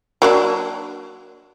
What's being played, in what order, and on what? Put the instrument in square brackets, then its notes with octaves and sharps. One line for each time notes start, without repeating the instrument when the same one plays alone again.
[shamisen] F#3 A#3 D4